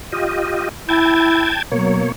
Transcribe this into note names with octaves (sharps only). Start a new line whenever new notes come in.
F4 G4 D#5
E4 G5 A5 G#6
B2 F#3 A#3 C#5